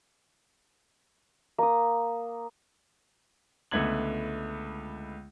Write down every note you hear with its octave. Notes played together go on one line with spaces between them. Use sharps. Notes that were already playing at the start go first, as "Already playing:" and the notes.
A#3 D#6
C#2 D3 A3 B3 G#6 F#7